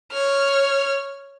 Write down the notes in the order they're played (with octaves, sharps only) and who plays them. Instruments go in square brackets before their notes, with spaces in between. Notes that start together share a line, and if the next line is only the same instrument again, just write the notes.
[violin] C#5 F6